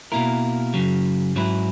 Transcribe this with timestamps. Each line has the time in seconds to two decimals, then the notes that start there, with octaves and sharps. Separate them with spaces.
0.12 B2 A#3 E4 A#4
0.74 F#2 C#3 F#3
1.36 G#2 F#3 C#4 E4 B4